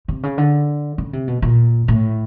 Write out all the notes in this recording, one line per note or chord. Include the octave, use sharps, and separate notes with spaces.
C3
C#3
D3
C#3
C3
B2
A#2
A2